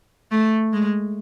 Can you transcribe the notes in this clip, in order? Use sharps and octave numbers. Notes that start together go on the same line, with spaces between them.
A3
G#3